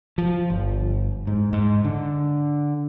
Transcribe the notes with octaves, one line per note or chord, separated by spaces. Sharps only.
F3
G1
G#2
G#2
D3